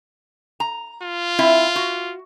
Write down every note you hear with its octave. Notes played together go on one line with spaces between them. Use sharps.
A#5
F4
C4 E4 E5
F#4